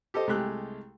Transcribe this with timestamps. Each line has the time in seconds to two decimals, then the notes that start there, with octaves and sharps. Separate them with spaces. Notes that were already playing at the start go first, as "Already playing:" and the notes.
0.14 G4 A4 C5 D#5
0.27 C2 G#3 A3 G4 G#4 F#6